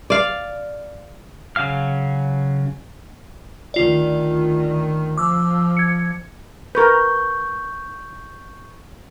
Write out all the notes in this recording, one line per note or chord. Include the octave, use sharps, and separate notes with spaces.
D5 F5
C#3 F#3 F5 F6
D2 D#3 F4 D5
F3 D6 E6
G#6 C#7
A#4 B4 C#6 G6